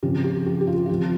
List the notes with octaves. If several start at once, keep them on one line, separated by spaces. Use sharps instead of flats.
C#3 F3 C4 G4
G4
G4
G4
F4
F4
F3 C4 G4